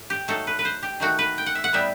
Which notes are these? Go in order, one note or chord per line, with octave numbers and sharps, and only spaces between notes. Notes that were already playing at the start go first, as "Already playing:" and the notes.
Already playing: A2
G4
F#3 A3 D#4 A4
B4
B4
C5
G4
D#3 A3 D#4 F#4
B4
G5
F#5
E5
F#5
A2 G3 B3 D#4 E5